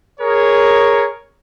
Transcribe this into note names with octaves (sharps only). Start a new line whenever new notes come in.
G#4 A#4 C#5